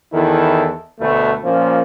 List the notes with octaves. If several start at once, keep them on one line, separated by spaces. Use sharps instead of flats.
E2 D#3 E4 A4
D2 B2 A3
A#2 F3 A#3 C#4